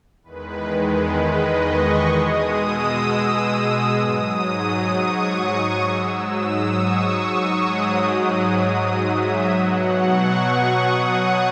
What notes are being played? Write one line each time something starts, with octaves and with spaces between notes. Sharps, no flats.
E2 D#3 G#3 B4
B4
D#5
C#6
B2 G#3 D#6
E6
G#2 F#3 D#6
D#6
C#6
C#6
G#2 F#3 E6
D#6
C#6
C#6
G#2 F#3 D#6
D#6
E5
B2 F#3 F#5
C#6
D#6
C#6